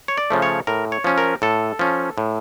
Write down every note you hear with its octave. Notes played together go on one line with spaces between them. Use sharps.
C#5
D5
C#3 F3 A3
C#5
A2 A#4
C#5
F3 C#4
A#4
A2 A4
F3 C#4
A2